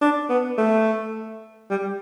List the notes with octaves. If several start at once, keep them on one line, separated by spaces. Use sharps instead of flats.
D4
B3
A3
G3